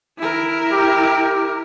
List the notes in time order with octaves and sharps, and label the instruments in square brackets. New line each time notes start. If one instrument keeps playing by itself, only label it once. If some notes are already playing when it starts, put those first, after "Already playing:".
[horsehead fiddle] E4 A#4
[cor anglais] G4